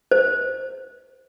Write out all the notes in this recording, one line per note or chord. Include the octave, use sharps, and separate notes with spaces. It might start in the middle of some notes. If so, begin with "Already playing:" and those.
C5